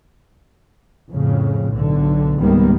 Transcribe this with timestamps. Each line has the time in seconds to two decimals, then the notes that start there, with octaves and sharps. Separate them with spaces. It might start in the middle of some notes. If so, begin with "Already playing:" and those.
1.10 F2 A2 C#3
1.73 B1 D3
2.41 C#2 G#2 D#3 G3 A#3 B3